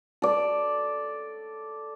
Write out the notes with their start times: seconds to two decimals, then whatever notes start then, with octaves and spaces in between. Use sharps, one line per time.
0.22 A4 D5